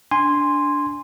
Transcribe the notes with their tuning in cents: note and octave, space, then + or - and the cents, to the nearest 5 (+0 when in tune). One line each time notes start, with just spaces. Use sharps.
D4 -5 G#5 -15 C6 +0